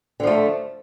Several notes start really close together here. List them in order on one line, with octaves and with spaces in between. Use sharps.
D3 F3 A3